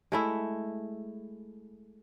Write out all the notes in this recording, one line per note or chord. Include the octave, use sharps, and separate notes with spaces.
G#3 A3 E4